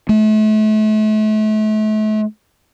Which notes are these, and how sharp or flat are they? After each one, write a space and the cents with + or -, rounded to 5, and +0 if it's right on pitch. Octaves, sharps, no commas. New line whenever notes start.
A3 -35